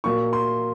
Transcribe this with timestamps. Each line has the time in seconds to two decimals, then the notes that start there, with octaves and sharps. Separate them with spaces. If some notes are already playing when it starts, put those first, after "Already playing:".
0.04 A#2 F#3 A#3 C#6
0.33 C6